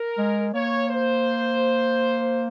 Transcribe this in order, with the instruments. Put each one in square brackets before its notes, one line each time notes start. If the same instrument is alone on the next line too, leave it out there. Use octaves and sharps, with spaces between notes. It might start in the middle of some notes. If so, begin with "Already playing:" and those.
Already playing: [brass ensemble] A#4
[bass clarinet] G#3
[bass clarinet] A#3 [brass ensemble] C#5
[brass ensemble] C5